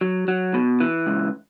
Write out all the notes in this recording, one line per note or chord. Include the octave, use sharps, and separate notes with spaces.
F#3
F#3
B2
E3
C#2